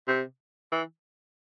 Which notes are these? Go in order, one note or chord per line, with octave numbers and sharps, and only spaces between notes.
C3
E3